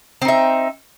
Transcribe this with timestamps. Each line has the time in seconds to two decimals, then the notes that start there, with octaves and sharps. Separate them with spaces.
0.22 C4
0.25 D#4
0.28 E5